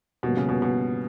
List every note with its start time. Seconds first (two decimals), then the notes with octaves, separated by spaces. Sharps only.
0.23 G2 B2 D3 F3 A#3 C#4
0.37 C#3
0.49 B2
0.62 B2